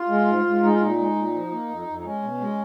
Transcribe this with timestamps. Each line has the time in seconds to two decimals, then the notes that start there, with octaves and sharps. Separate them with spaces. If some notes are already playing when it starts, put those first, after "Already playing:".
Already playing: F4
0.08 G#3
0.27 G#2
0.45 G#2
0.62 G#3 D#4
0.72 F4
0.80 A#2 D#4
0.98 G#3
1.15 A#2
1.34 F3
1.51 A#3
1.69 F2
1.87 F2
1.99 D#4
2.04 G#3 C#4
2.22 B2
2.40 G#3